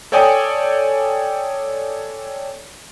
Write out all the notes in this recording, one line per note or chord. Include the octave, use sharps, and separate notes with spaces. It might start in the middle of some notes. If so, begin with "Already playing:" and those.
A4 C#5 D5 G5 G#5 D#6